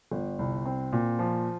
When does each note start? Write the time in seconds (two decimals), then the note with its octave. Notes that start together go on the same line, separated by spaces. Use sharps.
0.11 G1
0.39 C2
0.65 C4
0.92 A#2
1.19 F3